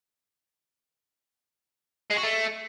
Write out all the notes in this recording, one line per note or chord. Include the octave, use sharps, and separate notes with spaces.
G#3
F#4
A3